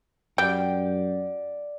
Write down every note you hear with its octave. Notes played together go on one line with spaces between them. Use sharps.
F#2 G3 G4 D5 F#5 G5